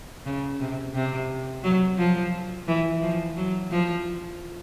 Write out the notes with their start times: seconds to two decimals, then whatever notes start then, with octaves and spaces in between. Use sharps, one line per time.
0.26 C#3
0.60 C3
0.94 C3
1.64 F#3
1.98 F3
2.68 E3
3.02 F3
3.37 F#3
3.71 F3